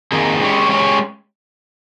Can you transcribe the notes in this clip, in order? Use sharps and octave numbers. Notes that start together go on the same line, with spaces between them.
F2 D#3 A#3 D#4 G#4
G#3 C#4 G4 C#5
G#3 C#4 G4 C#5